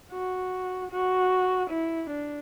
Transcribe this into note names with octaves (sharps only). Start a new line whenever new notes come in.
F#4
F#4
E4
D4